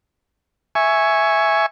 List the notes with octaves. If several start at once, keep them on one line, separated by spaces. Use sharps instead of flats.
E5 G#5 C#6